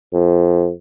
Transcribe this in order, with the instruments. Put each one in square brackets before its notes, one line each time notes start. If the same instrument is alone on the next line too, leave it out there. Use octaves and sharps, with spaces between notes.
[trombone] F2